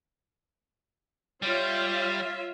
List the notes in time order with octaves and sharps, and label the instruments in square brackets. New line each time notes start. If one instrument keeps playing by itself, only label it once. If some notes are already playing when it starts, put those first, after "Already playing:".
[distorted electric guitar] G3 [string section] F4 C#5 E5